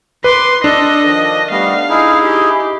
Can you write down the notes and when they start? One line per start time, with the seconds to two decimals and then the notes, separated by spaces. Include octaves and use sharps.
0.24 B4 C6 D6
0.64 D4 A4 D#5
1.05 D#3 F3
1.51 G3 A3 B3 F5
1.89 D#4 E4 G#4
2.23 G4